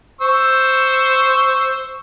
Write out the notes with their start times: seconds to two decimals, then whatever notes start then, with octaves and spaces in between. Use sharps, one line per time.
0.21 C5 C#6 E6